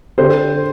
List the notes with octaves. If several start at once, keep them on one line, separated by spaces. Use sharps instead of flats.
D3 G4 C5